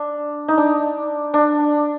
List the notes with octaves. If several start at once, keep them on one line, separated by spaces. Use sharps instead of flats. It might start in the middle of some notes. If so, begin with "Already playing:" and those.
Already playing: D4
D#4
D4
D4